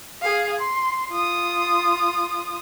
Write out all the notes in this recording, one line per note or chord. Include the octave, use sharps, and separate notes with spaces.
G#4 F5
C6
F4 D#6